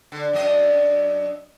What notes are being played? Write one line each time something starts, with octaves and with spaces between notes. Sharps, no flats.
D3
F#2 D4 D#5